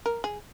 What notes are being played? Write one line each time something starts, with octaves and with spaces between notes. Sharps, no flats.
A#4
G#4